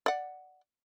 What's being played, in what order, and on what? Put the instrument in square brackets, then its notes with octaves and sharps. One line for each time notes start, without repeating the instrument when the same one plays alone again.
[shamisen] D5 F#5